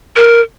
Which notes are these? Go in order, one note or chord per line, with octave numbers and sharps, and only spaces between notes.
A#4